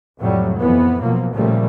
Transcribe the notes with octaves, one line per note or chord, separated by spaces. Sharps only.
F2 A2 C3 F#3 G3
F2 E3 B3
B2 F3 F#3 A#3
A#2 C#3 F3 G3 A3 A#3